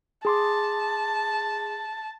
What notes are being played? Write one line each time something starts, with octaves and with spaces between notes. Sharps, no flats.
G#4 A5 C6 D6